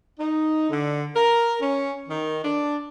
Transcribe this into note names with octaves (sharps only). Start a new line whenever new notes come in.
D#4
D3
A#4
C#4
D#3
D4